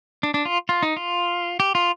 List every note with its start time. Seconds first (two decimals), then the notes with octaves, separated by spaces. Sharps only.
0.23 D4
0.34 D4
0.45 F4
0.69 F4
0.83 D#4
0.97 F4
1.60 G4
1.75 F4